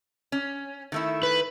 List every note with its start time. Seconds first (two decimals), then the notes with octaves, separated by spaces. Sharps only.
0.32 C#4
0.92 D#3 A3 E4
1.23 B4